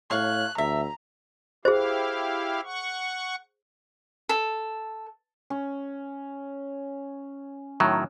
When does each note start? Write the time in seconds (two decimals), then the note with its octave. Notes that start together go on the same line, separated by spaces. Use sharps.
0.11 A2 C#5 F5 F#6
0.58 D2 E5 A#5
1.65 E4 G4 G#4 C5 F5
2.64 F#5 C#6
4.29 A4
5.50 C#4
7.80 A2 D#3 F#3